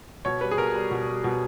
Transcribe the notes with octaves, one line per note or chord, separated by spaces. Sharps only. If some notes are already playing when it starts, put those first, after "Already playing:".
B2 C#5
G3 B4
G#4
B2 A#4
G3
B2
G3
B2